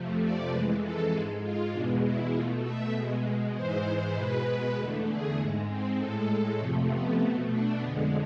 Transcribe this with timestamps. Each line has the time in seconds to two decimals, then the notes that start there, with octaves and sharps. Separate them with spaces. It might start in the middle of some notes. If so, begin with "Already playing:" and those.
Already playing: F2 C3 F3 A3
0.20 D5
0.50 F2 E3 G#3 B4
0.81 A4
1.11 G#2 G#3 G#4
1.41 F4
1.72 E2 B2 G#3 D4
2.02 E4
2.32 B2 A3 F4
2.63 E5
2.93 B2 G#3
3.54 G#2 E3 G#3 C5
4.15 B2 G#3 B4
4.76 E2 D3 A3
5.07 G#4
5.36 G#2 G#3
5.67 C4
5.97 A2 G#3 A4
6.58 F2 C3 F3 A3
6.88 B3
7.19 B2 A3 C4
7.50 D4
7.80 F2 D3 G#3 B3